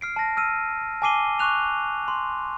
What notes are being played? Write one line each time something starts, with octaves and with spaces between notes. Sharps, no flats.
F6 C7 D7
A5 A#6
E6 F6 D#7
G#5 A5 D6 C7 D#7 G7
C#6 D6 F#6 F7
C6